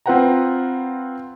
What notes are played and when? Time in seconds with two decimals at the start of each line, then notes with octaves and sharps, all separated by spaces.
0.06 C4 F4 B4 F#5 G5 A#5